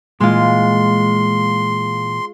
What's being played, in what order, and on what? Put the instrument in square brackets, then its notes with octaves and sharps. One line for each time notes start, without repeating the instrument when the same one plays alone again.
[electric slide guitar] A#2 E3 [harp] G#3 F4 [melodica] C6